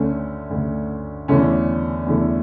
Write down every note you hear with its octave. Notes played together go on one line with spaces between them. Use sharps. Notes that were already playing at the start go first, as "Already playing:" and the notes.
Already playing: D2 D3 A3 C#4
D2 D3 A3
E2 D3 A3 C#4
E2 D3 A3